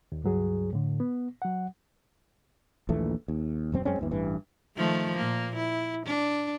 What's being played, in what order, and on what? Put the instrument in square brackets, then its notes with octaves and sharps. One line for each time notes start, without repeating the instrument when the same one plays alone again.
[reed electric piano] D#2
C#2 G2 F#3 G#4
A2 D3
B3
F#3 F#5
[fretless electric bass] A#1 D#2 E3 A3
D#2
E1 F#2 C4
F#2 G#3 C4 C#4
G1 D#2 E3
A1 G2 E3
[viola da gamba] D#3 F3 A3
A#2 A#3
E4
D4